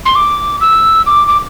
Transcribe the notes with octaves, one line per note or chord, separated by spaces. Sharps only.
C6
D6
E6
D6
D6